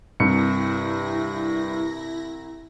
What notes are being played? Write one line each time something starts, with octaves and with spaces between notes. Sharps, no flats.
C2 G2 E4 A#6 C#7